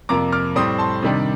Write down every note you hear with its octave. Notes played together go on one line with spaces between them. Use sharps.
F2 C3 F3 A#3 A#5 D6
D6 F6
A2 G3 C4 C6 D#6
A5 C6
C3 D#3 G3 D4